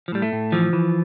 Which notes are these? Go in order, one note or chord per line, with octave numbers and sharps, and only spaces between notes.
F3
A2 G3
A3
A2
E3 F3
E3